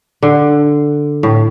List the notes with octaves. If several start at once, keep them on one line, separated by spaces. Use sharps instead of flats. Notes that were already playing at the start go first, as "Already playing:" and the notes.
D3
A2